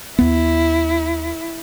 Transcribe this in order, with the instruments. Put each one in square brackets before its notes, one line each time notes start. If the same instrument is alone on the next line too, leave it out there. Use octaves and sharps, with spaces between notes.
[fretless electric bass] D#2 B3 [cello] E4